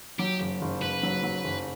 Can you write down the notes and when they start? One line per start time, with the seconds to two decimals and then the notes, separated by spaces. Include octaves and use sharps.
0.19 F#3 G4
0.40 F#1
0.61 F#1
0.82 F#1 B4
1.03 F#3
1.24 F#3
1.44 F#1